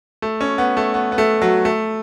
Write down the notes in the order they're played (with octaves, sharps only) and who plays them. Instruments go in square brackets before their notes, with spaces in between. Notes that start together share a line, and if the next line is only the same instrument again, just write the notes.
[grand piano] A3
C#4
B3
A3
B3
B3
A3
F#3
A3